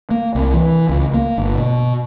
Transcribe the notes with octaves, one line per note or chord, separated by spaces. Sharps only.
A#3
C2
E3
C#2
A#3
G1
B2